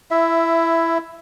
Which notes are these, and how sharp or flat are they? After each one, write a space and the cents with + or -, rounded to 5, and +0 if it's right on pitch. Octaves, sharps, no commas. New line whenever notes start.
E4 +15 E5 +0